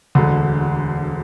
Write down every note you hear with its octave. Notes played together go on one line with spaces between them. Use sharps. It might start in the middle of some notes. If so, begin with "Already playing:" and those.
E1 D2 D3